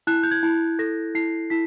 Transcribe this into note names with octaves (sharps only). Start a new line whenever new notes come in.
E4 F#6
G6
G#6
E4
A4 A#6
E4 C7
E4 B6